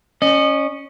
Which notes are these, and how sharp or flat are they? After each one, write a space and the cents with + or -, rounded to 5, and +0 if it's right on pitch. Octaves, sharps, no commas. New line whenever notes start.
C#4 +0 D#5 -35